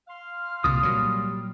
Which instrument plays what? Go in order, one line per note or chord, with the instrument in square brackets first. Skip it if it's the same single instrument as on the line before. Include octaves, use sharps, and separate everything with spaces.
[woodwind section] F5 C6 F6
[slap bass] C2 A#2 [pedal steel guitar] G3 D#6
[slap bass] A#2 F#3